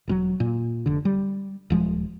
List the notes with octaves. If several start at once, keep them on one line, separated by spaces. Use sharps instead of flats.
E1 A2 F#3
A#2
F1 D3
G3
D#1 F3 G#3